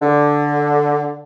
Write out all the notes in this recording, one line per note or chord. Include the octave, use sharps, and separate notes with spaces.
D3